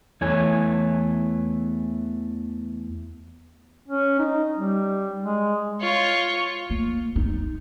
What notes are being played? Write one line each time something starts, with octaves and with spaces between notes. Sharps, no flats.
E2 E3 A3 C#5 G#5
C#4
D#4
G3
G#3
F4 C#5
A#3
D#4